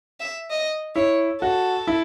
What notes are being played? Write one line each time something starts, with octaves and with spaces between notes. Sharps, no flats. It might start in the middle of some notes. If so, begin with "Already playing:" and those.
E5
D#5
E4 C#5
F#4 A4
E4